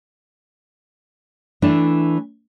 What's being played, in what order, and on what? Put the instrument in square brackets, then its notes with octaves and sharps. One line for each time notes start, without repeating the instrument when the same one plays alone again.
[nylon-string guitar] E3 A3 D4